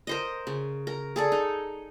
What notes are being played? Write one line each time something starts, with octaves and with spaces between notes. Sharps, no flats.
A#4 C5 D#5
C#3
A#4
G#4 A4 D5
D#4